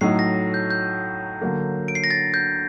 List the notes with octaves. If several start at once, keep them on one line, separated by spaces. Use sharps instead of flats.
A2 F#3 A3 D#4 C7
A#6
G6
G6
D3 F#3 A#3
D7
C7
A#6
A6
G6